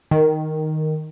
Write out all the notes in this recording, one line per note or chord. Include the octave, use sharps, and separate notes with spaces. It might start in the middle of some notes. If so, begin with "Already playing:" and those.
D#3